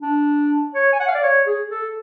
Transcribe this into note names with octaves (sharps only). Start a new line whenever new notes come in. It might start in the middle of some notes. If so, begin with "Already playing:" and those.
D4
C#5
G#5
F#5
F5
D5
C#5
G#4
A4